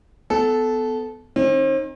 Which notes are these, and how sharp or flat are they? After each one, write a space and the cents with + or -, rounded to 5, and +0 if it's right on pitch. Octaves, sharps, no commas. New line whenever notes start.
B3 +20 A4 -15
D#3 +0 C4 +45 D#4 +0